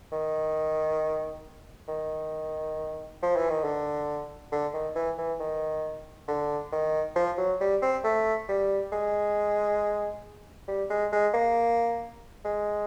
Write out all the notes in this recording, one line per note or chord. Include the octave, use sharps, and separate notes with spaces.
D#3
D#3
F3
E3
D#3
D3
D3
D#3
E3
E3
D#3
D3
D#3
F3
F#3
G3
C4
A3
G3
G#3
G3
G#3
G#3
A#3
G#3